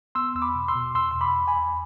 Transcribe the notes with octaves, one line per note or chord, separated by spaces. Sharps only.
B3 C6 E6
E2 E6
B5 D6
B2
C6 E6
B2
E2 C6 E6
E2 C6
B5 D6
E2
G#5 B5
E2